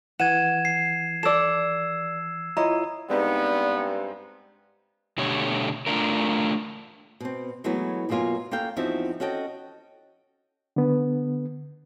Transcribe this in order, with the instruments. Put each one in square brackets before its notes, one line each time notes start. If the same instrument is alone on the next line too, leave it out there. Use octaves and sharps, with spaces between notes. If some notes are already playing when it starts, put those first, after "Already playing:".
[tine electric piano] E3 [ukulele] F#5 [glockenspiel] G#6 D#7 E7
[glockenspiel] C7
[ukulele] A4 D5 [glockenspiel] E6 E7
[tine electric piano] E4 F4 C#5 [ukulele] D#5 [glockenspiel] A#5
[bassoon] G2 [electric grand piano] G#3 C4 D#4 [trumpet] B3 [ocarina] D5
[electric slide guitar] B2 D3 A3 G4 C#5
A3 D4 F4 A#4
[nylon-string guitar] B2 C4
E3 F#3 G#3 A3 B3
F#2 B2 F#3 A#3 F4 G#5
A#3 C#4 A4 F5 G5
E2 F3 C4 D#4 F#4 E5
C#4 F#4 A4 D#5 G5
[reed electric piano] D3 B3